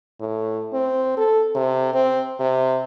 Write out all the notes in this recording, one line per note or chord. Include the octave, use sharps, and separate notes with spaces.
A2
C4
A4
C3
C4
C3